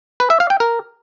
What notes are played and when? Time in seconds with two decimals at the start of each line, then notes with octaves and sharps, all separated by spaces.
0.20 B4
0.30 E5
0.40 F5
0.50 G5
0.60 A#4